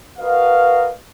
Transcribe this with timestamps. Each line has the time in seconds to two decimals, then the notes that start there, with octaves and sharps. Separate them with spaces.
0.19 F#4 A#4 B4 D#5 F5